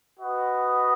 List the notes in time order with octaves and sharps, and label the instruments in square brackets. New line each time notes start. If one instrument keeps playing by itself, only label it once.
[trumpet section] F#4 B4 D#5